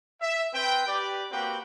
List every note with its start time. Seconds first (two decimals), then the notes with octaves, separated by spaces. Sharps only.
0.21 E5
0.53 C4 B4 G5
0.87 G4 B4 D5
1.31 A#3 C4 F#4 G4 B4 G5